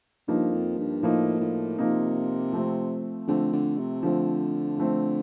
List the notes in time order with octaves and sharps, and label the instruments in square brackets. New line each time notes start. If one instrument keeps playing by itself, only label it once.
[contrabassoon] G2 [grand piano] F3 A#3 D#4
[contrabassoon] F2
G2
[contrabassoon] A2 [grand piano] F3 A#3 D#4
[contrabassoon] A2
[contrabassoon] C3 [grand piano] F3 A#3 D#4
[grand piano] F3 A3 C4
[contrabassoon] D3 [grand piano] F3 A3 C4
[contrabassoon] D3
C3
[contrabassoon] D3 [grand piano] F3 A3 C4
[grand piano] F3 A3 C4